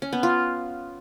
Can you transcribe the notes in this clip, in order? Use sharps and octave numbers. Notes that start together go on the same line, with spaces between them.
C#4
B3
F4